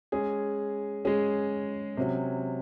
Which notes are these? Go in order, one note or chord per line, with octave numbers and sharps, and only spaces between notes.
G#3 C#4 G#4
G#3 C#4 G#4
C3 F#3 C#4